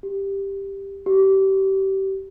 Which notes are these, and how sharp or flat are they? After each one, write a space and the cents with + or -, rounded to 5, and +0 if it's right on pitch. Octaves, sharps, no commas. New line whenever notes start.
G4 +5
G4 -25